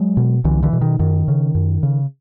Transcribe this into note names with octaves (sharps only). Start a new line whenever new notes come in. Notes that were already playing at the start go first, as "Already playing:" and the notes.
Already playing: F#3 G#3
B2
C2 D3 E3
D3 E3
B2
D#3
F#2 D#3
C#3
F#2
C#3